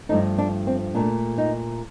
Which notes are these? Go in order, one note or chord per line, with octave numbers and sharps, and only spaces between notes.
G2 F3 A3 D#4
D4
C4
A#2 A3 D4
D#4